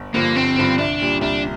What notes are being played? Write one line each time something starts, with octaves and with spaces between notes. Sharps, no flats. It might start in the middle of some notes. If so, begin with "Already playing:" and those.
Already playing: G1
G2 D3 F3 A#3
G1 C4
G2 D3 F3
C2 D4
A#2 G3
C2 D4